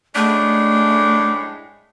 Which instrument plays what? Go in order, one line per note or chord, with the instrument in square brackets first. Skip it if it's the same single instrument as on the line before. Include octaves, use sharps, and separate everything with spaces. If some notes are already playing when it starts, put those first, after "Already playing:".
[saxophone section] F#2 A2 G#3 [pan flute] A3 [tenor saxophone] D4